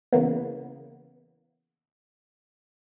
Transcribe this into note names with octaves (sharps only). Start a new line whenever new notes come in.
C#3 E3 A#3 B3